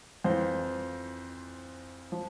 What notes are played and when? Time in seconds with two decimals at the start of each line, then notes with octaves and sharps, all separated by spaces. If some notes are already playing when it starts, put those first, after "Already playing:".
0.24 F2 E3 C5
2.12 F3